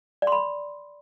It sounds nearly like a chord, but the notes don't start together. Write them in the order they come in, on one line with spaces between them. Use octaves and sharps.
D5 C6 B5